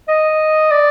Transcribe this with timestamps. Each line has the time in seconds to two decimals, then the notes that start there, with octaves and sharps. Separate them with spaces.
0.09 D#5
0.72 D5